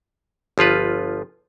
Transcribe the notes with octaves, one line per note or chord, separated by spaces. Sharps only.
G1 F3 F4 B4